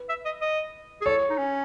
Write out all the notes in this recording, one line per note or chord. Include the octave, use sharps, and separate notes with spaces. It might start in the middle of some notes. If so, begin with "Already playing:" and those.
Already playing: B4
E5
D#5
D#5
G#4
A4 C#5
D#4
C#4